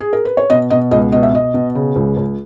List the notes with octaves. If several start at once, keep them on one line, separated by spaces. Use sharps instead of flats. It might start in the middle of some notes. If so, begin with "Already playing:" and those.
G#4
A#4
B4
C#5
B2 D#5
B2 D#5
C#2 D#5
B2 D#5
E5
B2 D#5
B2
C#3
C#2
C#2